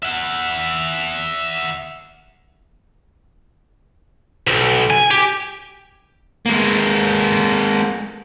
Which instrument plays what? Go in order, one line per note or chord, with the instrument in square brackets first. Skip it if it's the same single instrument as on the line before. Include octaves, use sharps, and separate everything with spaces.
[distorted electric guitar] E5 F#5
B1
G#5
G4
[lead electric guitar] G#3 A#3